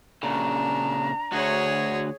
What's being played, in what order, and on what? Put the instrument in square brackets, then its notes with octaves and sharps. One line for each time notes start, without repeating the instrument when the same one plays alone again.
[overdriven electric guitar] A#2 C#3 [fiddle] D4 [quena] A#5
[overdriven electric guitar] D2 F#4 [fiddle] G#4 C#5